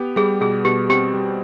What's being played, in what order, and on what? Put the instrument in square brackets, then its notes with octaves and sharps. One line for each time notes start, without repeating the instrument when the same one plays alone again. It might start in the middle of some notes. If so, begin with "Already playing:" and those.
Already playing: [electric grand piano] B3 G4
[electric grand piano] G3 [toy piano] G#4
[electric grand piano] B2 [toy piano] G#4
[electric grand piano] B2 [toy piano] G4
[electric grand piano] C4 [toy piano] G4
[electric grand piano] G3